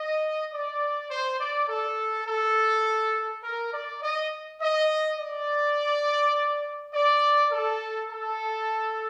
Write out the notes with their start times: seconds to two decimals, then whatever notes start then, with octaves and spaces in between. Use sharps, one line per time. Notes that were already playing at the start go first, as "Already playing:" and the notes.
Already playing: D#5
0.52 D5
1.10 C5
1.39 D5
1.68 A4
2.27 A4
3.44 A#4
3.73 D5
4.02 D#5
4.60 D#5
5.19 D5
6.93 D5
7.52 A4
8.10 A4